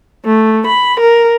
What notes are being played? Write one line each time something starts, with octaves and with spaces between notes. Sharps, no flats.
A3
B5
A#4